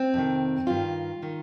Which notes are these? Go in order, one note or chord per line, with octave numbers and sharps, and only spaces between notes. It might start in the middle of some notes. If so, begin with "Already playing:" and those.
Already playing: C4
F2 C3 D#3
G2 D#3 F4
D#3